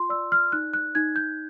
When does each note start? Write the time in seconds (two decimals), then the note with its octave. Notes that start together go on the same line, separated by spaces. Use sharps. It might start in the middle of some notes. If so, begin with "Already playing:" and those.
Already playing: F4 C6
0.09 D5 E6
0.32 F6
0.52 D#4 F#6
0.73 F#6
0.95 D#4 G#6
1.16 G6